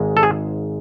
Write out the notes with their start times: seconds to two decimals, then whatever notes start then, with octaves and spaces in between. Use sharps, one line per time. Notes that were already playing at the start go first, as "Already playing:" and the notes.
Already playing: G#1 G#2 G#3
0.17 A4
0.23 G#4